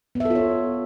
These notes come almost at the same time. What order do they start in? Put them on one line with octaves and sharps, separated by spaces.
B3 E5 A4 F4 C#5